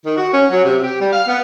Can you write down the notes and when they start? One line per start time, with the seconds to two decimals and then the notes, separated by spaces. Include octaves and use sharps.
0.05 D#3
0.17 F#4
0.32 C#4
0.51 F#3
0.64 C3
0.82 G4
0.99 G3
1.13 F5
1.27 B3